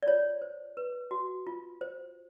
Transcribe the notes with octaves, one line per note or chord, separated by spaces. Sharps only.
D5
F4 C#5
C5
B4
F#4
F4
C5